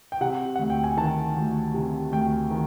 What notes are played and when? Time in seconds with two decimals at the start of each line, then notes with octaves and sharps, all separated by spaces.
0.12 G5
0.21 C3 F#5
0.56 D2 F#5
0.70 G5
0.84 G#5
0.97 D#3 A5
1.37 D2
1.74 C3
2.12 D2 G5
2.51 D#3